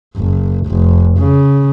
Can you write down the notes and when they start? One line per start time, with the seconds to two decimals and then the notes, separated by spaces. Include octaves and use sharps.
0.16 F#1
0.67 F1
1.18 C#3